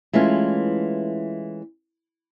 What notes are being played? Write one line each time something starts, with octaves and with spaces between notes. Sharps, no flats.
E3 G#3 A3 C#4 F4